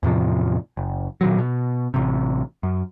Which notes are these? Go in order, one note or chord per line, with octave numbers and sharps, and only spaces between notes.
E2 A2 C3 F3
F#1
A#2 D#3 F#3
B2
A1 C3
F#2